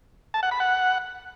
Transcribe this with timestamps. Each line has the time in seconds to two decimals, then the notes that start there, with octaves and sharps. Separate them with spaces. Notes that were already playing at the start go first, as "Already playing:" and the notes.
0.34 A5
0.43 F#5
0.51 B5
0.60 F#5